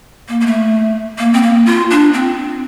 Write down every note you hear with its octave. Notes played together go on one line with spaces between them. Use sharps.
A#3
A#3
A3
A#3
C4
A#3
F4
D4
C4